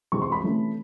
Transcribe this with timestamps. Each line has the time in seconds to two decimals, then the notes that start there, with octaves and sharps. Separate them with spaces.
0.12 C3 E3 G#3 C4 C#6
0.22 C6
0.32 B5
0.43 C3 E3 A3 C#4